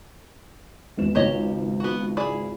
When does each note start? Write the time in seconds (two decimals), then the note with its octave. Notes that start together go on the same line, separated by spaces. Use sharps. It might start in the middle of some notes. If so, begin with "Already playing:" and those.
0.97 G#1 E2 E7
1.15 G#1 C#2 G#2 G4 C#5 D#5
1.80 B3 F#4
2.17 E4 G#4 D5